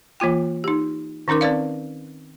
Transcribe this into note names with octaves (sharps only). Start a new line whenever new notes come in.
E3 A#3 F4 G5
D#4 G4
D#3 C#4 D#4 A#4 D6
C4 B4 D5 F5